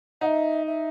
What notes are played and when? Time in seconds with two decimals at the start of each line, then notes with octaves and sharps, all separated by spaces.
0.21 D#4 F#5
0.26 E5
0.67 E5